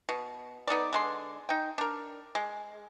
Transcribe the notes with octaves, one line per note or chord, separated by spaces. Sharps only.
B2
B3 D#4 A4 D5
D3 G#3 C6
D#4 G5
D4 A#4
G#3